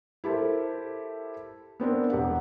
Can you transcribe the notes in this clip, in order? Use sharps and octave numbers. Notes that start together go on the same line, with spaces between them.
E4 G4 A4 A#4 C5
B3 C4 D4 A#4
E1 G4 F#5